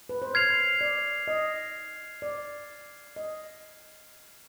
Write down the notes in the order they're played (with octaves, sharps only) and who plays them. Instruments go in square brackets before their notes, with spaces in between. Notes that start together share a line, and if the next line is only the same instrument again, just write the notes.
[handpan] B4
C5
[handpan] C#5 [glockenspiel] F6 G#6 C7 F7
[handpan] D5
D#5
D5
D#5